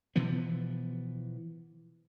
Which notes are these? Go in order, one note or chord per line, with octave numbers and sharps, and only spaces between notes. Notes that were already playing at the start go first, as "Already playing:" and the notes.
B2 E3 F3 B3